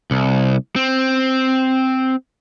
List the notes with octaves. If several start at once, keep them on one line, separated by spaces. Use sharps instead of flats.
C2
C4